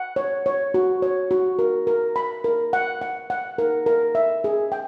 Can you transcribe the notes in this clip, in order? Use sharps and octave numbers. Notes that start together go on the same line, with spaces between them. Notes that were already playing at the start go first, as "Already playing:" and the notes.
Already playing: F#5
C#5
C#5
F#4
C#5
F#4
A#4
A#4
B5
A#4
F#5
F#5
F#5
A#4
A#4
E5
G#4
G5